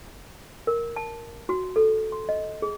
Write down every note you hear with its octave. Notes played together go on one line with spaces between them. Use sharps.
A#4
A5
F#4
A4
C6
D#5
G#4